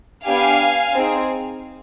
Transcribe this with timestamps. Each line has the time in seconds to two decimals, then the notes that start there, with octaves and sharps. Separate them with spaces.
0.25 B3 D4 G4 F5 G#5
0.95 C4 D#4 G#4